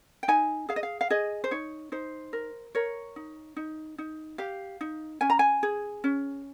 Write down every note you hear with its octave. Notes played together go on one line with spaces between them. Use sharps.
G5
D#4 G#5
G#4 F5
D#5
F5
F5
G#4 D#5
C5
D#4 C#5
D#4 C5
A#4
A#4 C#5
D#4
D#4
D#4
G4 F5
D#4
C#4 G#5
A#5
G#5
G#4
C#4